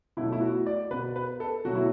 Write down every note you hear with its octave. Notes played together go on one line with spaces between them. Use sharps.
B2 F#3 A3 E4
E4
F#4
D5
B2 B3 B4
B4
A4
B2 F#3 A3 F#4
E4